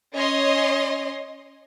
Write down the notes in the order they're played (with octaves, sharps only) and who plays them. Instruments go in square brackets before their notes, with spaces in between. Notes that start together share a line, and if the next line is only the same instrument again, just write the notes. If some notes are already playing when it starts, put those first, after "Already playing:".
[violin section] C#4 C#5 D#5 C6